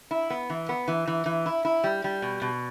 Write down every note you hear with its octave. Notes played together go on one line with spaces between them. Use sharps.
E4
B3
E3
B3
E3
E3
E3
E4
E4
G3
G3
B2
B2